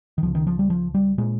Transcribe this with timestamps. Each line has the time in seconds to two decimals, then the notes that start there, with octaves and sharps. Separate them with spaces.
0.18 D#3
0.22 C#2 F3
0.26 C#3
0.35 D#3
0.47 F3
0.59 G3
0.70 F3
0.94 G3
1.18 A#2 G#3